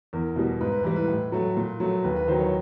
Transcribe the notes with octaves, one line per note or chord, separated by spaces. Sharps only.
E2 A#4
B2 G3
G#2 B4
B4
E3 G3 B4
B4
A2
F#3 A3
A#2
F#3 A3
D#2 B4
B4
D#3 F#3 C5
C#5